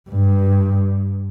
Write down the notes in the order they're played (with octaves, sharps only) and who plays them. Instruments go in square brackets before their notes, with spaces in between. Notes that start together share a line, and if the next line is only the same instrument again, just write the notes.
[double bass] G2